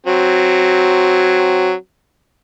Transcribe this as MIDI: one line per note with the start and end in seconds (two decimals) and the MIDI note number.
0.06 1.73 54
0.06 1.73 60